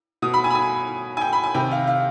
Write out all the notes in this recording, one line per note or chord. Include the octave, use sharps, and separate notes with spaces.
B2 D#6
B5
G#5
B5
G#5
G#5
G5
B5
G#5
C3 D#3 G5
F5
F5